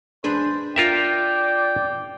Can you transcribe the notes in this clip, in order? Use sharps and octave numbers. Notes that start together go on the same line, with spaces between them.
D4 G#4 B4 C5
F4 A#4 D5 E5 G5